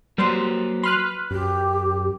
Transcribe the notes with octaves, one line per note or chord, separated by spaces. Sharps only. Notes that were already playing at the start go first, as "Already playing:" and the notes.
F#3 G3 A#3 B4 C5 C6
B4 B5 C6 F6 F#6
F#2 G4